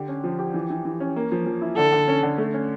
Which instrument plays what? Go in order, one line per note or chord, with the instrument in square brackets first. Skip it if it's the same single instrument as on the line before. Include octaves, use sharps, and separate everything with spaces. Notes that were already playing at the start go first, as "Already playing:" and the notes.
Already playing: [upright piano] D3 G4
C#4
F3
G4
E3
E3
E3
C#4
A#3
F3
F3
E4
[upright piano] D3 [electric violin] A4
[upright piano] D3
C#4
D3
A3
C#4